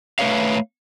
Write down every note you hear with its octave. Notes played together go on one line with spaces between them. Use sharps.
A3 B4 C#5 F5